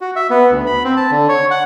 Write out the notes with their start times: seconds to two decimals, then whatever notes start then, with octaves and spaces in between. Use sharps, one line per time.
0.01 F#4
0.16 E5
0.30 B3
0.51 D2
0.66 B5
0.84 C4
0.97 A5
1.11 D3
1.29 C#5
1.51 F#5